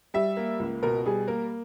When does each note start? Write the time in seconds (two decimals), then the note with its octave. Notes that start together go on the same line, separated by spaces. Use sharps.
0.14 G3 E5
0.37 A#3
0.60 C#2
0.83 B2 A#4
1.06 G3 G#4
1.27 A#3 A#4